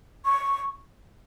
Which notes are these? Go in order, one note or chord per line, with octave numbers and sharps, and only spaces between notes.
C#6